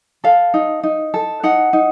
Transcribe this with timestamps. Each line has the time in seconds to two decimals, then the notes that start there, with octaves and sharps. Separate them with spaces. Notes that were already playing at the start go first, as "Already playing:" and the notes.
0.24 A4 F5
0.54 D#4
0.83 D#4
1.14 A4
1.43 D#4 F#5
1.73 D#4